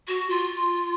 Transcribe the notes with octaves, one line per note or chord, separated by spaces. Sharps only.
F#4
F4